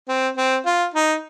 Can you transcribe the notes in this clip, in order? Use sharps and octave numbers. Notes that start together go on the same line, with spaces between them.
C4
C4
F4
D#4